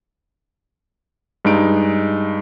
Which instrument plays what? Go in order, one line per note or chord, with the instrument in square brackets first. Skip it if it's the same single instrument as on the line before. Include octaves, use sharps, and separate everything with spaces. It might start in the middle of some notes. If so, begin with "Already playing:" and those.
[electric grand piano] G2 G#3 D#4 D7